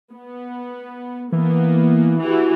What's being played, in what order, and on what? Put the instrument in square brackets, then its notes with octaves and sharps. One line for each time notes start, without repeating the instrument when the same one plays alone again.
[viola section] B3
[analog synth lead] E3 [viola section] A#3 B3
[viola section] E3 F#4 G4